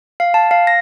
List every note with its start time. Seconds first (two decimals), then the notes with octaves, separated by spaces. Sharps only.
0.20 F5
0.34 A5
0.51 F5
0.67 A#6